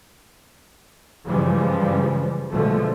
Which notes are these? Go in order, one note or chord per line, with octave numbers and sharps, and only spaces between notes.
G2 C#3 E3 F3 G3 G#3
B2 D3 F3 G#3 A3